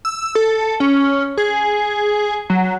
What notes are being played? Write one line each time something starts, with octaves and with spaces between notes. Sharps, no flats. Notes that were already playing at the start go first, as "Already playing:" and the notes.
E6
A4
C#4
G#4
F#3